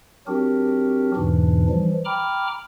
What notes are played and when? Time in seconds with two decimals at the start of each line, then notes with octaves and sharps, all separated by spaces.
0.27 F#3 C4 D4 F#4 G4 A#4
1.16 E2 G#2 B2 E3 D4
1.69 E3 F3 G3
2.05 G5 A#5 B5 D6 F6